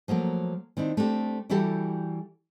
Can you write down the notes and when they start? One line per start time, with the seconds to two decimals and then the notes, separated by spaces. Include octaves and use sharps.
0.08 F3 F#3 A3 A#3
0.77 D#3 C4 D4 E4
0.97 A3 C4 D4 G4
1.50 E3 G3 E4 F#4 G4 A4